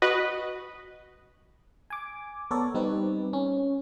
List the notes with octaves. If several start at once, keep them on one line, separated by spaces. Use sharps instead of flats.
F#4 B4 D#5
G#5 D6
B3 A4 A#4 C#5 D5
G3 C4 D#4 B4
C#4